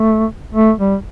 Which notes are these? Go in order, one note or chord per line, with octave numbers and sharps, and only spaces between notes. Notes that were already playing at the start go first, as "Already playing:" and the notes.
Already playing: A3
A3
G3